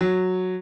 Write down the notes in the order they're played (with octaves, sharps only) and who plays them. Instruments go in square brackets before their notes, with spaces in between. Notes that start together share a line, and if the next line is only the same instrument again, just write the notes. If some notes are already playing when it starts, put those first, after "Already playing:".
[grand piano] F#3